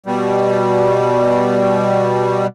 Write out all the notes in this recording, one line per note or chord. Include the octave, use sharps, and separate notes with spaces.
B2 G3